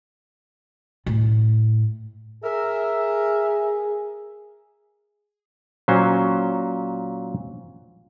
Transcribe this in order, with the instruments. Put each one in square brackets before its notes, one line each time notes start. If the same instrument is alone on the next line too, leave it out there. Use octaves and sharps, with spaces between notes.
[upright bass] A2
[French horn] G#4 [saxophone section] A#4 E5
[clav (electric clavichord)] A#2 F#3 C#4 C5